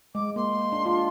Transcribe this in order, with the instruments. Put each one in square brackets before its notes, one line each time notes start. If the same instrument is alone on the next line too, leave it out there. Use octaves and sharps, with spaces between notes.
[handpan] G#3 [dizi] D6
[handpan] A#3 [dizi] C6
[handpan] D4
F4